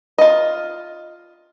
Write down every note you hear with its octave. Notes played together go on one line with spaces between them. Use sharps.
F4 D#5